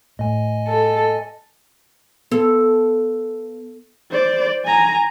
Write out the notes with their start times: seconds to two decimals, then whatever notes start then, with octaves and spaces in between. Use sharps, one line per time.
0.19 A2 D#5 G#5
0.68 A4
2.32 B3 A4
4.11 C5 D5
4.65 G#5 A#5